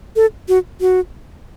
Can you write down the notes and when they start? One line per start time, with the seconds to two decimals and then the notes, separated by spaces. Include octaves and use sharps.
0.16 A4
0.49 F#4
0.81 F#4